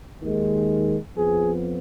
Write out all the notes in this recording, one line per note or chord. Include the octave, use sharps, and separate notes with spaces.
D#2 D#3 G#3
F2 F3 B3 G#4